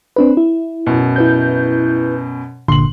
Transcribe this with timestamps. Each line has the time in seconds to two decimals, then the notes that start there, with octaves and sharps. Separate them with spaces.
0.16 C4 D4 B4
0.37 E4
0.87 F#2 B2
1.16 E4 B4 G6
2.68 G1 A#2 D3 C6 F#7